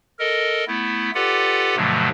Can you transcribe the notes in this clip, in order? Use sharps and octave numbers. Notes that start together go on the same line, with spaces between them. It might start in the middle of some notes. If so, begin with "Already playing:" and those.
A4 A#4 D#5
A3 B3 E4
F4 G4 A4 B4 D5 F#5
G2 B2 D3 F3 F#3 A3